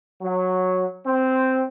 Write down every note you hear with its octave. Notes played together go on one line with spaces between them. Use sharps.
F#3
C4